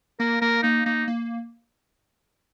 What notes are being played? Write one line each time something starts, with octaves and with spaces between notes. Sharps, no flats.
A#3 A#4
A#3 A#4
A#3 D#4
A#3 D#4
A#3